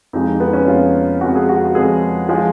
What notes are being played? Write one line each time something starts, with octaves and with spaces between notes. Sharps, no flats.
F2 F3 G#3 D#4
D#4
B3
C#4
F2 F3 G#3 F4
F2 F3 G#3 F#4
G#4
F#4
F2 F3 G#3 G#4
F3 G#3